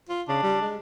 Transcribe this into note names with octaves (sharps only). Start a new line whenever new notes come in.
F4
C#3 D4
G3
G#3